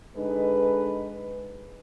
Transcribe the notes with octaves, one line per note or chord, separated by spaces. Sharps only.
D3 G#3 D#4 B4